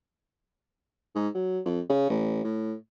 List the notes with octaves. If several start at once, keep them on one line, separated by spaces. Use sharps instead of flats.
G#2
F#3
F2
C#3
A1
A2